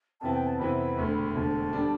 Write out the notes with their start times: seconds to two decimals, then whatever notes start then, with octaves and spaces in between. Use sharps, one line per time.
0.21 F2 C3 E3 B3 A5
0.33 G5
0.47 A5
0.59 F2 C3 E3 B3 B5
0.97 E1 D2 D3
1.35 E1 D2 D3 A5
1.73 D3 G3 D4